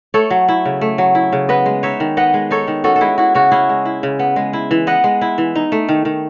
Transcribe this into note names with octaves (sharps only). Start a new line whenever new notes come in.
A3 A4 C#5
F#3
E4
C#3
A3
F#3
E4
C#3
B3 B4 D#5
G#3
D#4 C#5 E5
D#3
B3 D#5 F#5
G#3
D#4 A4 C#5
D#3
C#4 F#4 A4
A4
G#3 E4 G#4
E4 F#4
C#3 F#4
C#4 E4 G#4
G#3
E4
C#3
B3
G#3
E4
E3
B3 D#5 F#5
G#3
E4
E3
D#4
A3
D#3
D#3